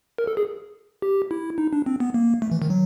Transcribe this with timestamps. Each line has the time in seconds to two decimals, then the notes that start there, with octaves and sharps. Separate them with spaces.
0.18 A#4
0.27 A4
0.37 G#4
1.02 G4
1.31 E4
1.58 D#4
1.73 D4
1.86 C4
2.00 B3
2.14 A#3
2.42 A3
2.51 E3
2.62 D#3
2.70 F#3